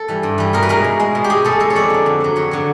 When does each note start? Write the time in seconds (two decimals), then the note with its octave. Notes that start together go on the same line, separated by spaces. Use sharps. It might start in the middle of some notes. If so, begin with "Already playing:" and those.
Already playing: A4
0.08 E3 G3
0.23 G2
0.38 E3 G3
0.53 B2 A#4
0.62 B4
0.69 G#3 A#4
0.84 B2
1.00 G#3
1.15 B2
1.24 G4
1.30 G#3 G#4
1.44 B2 A4
1.60 G#3 A4
1.70 C#5
1.76 F2 D5
1.90 D3 F#3
2.06 F2
2.20 D3 F#3
2.36 F2 C#5
2.51 D3 F#3